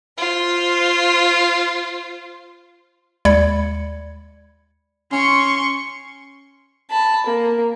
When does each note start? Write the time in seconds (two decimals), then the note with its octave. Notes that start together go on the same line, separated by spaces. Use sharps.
0.17 F4 C5
3.25 D#2 G#3 D5 B5 G#6 C#7
5.13 C#4 C6 C#6
6.91 A5 B5
7.27 A#3